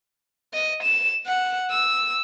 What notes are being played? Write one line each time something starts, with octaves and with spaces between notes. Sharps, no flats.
D#5
E7
F#5
E6